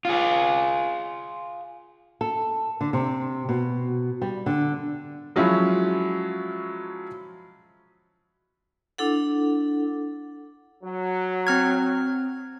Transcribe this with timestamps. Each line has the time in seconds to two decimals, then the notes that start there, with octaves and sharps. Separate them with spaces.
0.05 F4 G#4
2.21 A4
2.81 D3
2.93 C3
3.49 B2
4.22 G3
4.46 D3
5.36 F3 F#3 G#3 C#4 E4 F4
8.98 D4 E4 A4 F#5
10.83 F#3
11.47 C4 F6 G#6